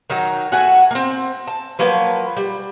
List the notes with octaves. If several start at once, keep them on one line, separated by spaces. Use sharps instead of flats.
D#3 F#3 D#4
A3 F#4 F#5 G#5
A#3 C4
A5
F3 F#3 A#3 B4
G3